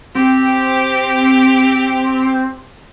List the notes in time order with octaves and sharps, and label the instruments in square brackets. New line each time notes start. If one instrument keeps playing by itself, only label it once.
[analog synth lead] C4 [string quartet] G4